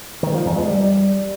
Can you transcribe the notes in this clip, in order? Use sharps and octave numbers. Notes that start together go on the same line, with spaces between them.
D#3
F3
E2
G#3
G3